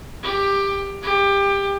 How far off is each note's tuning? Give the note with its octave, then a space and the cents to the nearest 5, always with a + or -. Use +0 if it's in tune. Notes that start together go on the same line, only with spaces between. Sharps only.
G4 +15
G4 +20